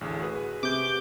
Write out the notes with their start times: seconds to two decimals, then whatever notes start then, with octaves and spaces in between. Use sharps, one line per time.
0.01 A1 D2 G#4
0.19 F#4 G#4 B4
0.63 C3 D6 G6